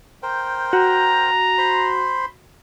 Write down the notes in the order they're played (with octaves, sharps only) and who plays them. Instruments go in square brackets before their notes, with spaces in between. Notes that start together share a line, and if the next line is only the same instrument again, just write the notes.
[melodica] A#4 C5 G5
[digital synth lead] F#4 [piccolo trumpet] A#5
[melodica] C5 B5 C6